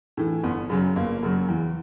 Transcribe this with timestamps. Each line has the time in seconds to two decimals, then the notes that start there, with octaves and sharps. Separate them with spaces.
0.17 A2 E3
0.44 G1 B3
0.70 F#2 C#3 F#3
0.96 G1 A#3
1.23 F#2 C#3 F#3
1.49 E2